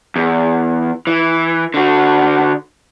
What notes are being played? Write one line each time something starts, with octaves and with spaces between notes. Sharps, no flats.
E2
E3
D3 F#4